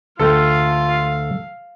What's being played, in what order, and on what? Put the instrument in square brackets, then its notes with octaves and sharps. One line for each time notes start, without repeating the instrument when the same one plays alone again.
[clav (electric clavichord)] D2 A3 G5 [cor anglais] F4 [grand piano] A4 [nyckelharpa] F5